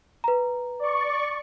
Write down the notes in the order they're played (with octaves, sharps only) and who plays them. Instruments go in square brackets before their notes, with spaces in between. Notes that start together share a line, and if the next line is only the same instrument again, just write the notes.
[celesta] B4 A#5
[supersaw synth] D5 C#6